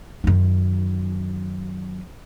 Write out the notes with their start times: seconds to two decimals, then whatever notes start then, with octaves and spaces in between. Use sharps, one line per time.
0.24 F#2 D#3